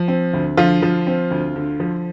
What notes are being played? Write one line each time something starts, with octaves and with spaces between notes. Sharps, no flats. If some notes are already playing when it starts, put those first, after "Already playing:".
Already playing: F3
C4
D2
D3 F3 F4
F3
C4
D2
D3
F3